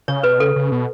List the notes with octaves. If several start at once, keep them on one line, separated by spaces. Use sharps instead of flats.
C#3 C#5
B2 B4
C#3 A4
C#3
B2